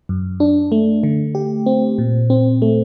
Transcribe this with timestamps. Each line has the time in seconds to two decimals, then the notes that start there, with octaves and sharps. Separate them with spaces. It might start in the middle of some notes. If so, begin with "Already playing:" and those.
0.09 F#2
0.40 D4
0.72 A3
1.03 D3
1.35 G4
1.66 C4
1.98 A#2
2.30 C4
2.62 A3